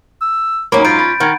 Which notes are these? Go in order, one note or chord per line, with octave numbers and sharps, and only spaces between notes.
E6
G#2 F#3 A#3 C#4 B5
C#4 F4 G6 D7
B5 A6
D#3 A#4 F#5 G#6